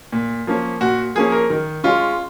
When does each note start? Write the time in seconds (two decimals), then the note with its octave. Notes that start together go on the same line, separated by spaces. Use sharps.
0.12 A#2
0.47 F3 A#3 C#4
0.81 A#2 F#4
1.15 F3 A#3 C#4 G#4
1.32 A#4
1.50 D#3
1.84 G#3 C#4 F4